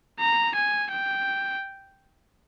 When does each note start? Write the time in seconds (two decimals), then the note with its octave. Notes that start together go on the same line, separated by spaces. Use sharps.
0.20 A#5
0.55 G#5
0.91 G5